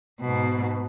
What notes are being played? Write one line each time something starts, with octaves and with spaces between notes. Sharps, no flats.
G#2 B2